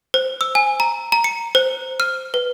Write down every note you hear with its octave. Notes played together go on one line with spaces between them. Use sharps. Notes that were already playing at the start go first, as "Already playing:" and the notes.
C5
E6
G#5
A#5
A#5
C#7
C5
F6
B4